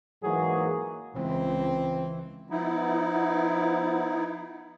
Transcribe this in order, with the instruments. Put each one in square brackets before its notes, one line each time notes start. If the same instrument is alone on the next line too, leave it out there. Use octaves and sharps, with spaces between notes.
[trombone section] G#2 E3 F#3 A#3 G#4
[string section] C#2 [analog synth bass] E3 [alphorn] C4
[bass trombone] F3 [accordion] B3 D#4 E4